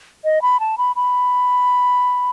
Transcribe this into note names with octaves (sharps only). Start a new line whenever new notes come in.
D#5
B5
A5
B5
B5